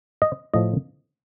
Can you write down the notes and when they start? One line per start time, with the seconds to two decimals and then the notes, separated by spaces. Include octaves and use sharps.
0.22 D#5
0.54 A2 F3 D#5